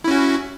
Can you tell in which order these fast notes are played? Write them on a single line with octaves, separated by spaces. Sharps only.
E4 C#4 F#4